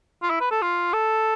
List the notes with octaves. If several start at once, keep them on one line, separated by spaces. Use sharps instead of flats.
F4
E4
B4
A4
F4
A4